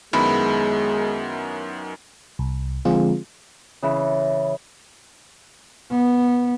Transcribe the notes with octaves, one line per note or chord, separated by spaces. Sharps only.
F#2 D#3 G#3 B3 E4
C2
D3 F3 G#3 C4 F4 G#4
C#3 E3
B3